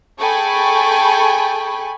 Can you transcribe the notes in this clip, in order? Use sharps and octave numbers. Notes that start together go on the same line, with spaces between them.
G#4 A4 G5 G#5 B5 C#6